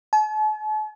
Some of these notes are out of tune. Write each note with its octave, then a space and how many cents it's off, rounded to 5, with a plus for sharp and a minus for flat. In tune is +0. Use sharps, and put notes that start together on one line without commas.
A5 -45